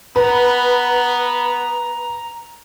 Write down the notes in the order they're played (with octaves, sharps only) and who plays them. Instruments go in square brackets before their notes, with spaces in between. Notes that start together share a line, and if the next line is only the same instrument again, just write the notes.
[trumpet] B3 [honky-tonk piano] B4 [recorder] A#5